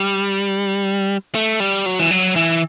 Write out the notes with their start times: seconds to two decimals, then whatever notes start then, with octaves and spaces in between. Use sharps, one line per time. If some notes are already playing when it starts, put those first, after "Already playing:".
Already playing: G3
1.35 A3
1.60 G3
1.86 F#3
2.00 E3
2.11 F#3
2.36 E3